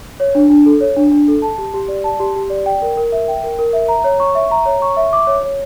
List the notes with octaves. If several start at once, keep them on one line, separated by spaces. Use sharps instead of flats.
C#5
D4
D4
A4
C#5
D4
D4
A4
A5
G4
G4
D5
A5
G4
G4
D5
G5
A#4
A#4
E5
G5
A#4
A#4
E5
A#5
C#5
C#6
E5
A#5
C#5
C#6
E5
D6
C#5
C#5